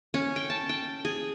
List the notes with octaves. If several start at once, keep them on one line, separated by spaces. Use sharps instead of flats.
C#4
G5
A5
G5
G#4